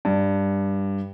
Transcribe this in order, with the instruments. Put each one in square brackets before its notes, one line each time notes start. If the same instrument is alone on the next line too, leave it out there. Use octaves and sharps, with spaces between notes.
[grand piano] G2